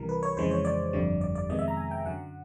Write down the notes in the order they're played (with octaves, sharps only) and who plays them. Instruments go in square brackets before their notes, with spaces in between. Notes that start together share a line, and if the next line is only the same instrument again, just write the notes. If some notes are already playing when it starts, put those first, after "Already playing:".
Already playing: [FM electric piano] C2 C3 E3 G3 A#4
B4
C#5
F2 C#3 E3 G#3 C5
C#5
D5
G1 F2 D3 G3
D5
D5
F2 C3 D#3 G#3 B3 D#5
E5
A#5
G#5
G5
F#2 D3 F#3 F#5